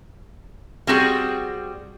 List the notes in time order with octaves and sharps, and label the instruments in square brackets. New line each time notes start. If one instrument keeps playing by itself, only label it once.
[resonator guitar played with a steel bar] G3 C4 F#4 G#4